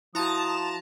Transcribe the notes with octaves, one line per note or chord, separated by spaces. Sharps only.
F3 E4 F#4 A5 A#5 D#6